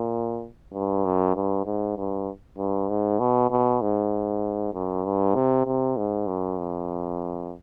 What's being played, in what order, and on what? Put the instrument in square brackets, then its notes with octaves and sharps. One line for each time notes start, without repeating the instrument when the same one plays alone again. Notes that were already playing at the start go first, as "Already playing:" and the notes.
Already playing: [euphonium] A#2
G2
F#2
G2
G#2
G2
G2
G#2
B2
B2
G#2
F#2
G2
C3
C3
G#2
F#2
F2